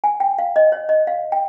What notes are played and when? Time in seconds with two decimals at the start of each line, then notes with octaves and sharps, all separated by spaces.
0.04 G#5
0.20 G5
0.38 F5
0.56 D#5
0.72 C#5
0.89 D#5
1.07 F5
1.32 G5